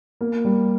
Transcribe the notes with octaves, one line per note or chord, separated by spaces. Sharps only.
A#3
G3